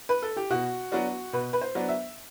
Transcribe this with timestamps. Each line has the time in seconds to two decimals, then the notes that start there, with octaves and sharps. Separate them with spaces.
0.09 B4
0.22 A4
0.37 G4
0.50 B2 F#4
0.92 F#3 B3 D4 F#4
1.33 B2 B4
1.53 B4
1.61 C5
1.75 F#3 B3 D4
1.88 E5